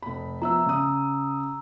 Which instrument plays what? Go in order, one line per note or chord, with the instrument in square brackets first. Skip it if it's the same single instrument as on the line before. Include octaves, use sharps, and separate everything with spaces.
[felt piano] F1 B5
[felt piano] F3 B3 E5 [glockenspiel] A#5 E6
[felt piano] C#3 D#6